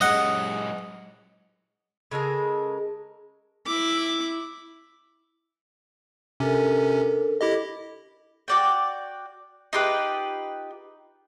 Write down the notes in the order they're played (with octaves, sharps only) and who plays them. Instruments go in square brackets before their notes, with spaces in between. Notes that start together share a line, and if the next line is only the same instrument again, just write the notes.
[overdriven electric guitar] F#2 G#3 [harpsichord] D#5 F#5
[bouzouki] C#3 G#3 A4 A#4
[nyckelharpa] E4 D6
[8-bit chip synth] C3 C#4 [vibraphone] D4 A4 A#4
[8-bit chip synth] E4 G4 D#5 [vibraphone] A4
[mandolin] F#4 D5 G5
D#4 F4 G4 B4